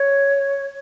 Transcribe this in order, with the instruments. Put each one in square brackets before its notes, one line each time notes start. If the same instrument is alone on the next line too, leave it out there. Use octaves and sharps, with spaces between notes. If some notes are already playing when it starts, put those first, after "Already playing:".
Already playing: [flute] C#5